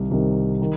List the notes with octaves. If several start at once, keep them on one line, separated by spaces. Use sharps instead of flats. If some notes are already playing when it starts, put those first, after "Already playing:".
Already playing: C2 C3 D#3
C2 C3 D#3
D#3